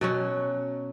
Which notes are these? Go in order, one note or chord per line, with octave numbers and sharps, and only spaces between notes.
B2 F#3 C#4